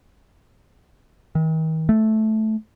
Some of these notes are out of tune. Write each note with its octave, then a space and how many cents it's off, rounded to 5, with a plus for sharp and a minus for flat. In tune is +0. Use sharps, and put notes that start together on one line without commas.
D#3 +40
A3 -10